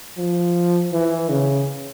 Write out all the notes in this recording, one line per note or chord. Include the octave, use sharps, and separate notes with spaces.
F3
E3
C#3